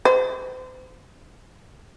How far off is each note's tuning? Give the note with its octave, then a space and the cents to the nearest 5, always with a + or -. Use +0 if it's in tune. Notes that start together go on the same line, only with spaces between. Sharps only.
C5 -35